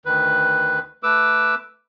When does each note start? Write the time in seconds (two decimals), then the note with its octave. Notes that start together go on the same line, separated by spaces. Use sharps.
0.06 D2 D#3 B4
1.03 A3 B4 D6 E6